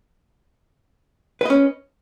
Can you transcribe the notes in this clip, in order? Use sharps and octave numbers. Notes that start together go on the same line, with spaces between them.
C#4 B4 D#5